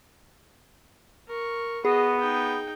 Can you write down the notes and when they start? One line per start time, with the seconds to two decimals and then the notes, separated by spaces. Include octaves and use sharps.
1.28 A#4 C#6
1.85 B3 F#4 G#4 D#5
2.20 D#4 G5